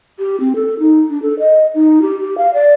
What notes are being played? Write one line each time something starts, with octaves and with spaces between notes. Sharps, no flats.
G4
C4
A4
D#4
D4
A4
D#5
D#4
G4
G4
F5
D5